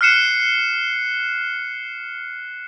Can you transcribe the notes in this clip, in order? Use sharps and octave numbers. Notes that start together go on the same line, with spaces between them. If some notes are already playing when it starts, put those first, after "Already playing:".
F6 F#6 C7 C#7 E7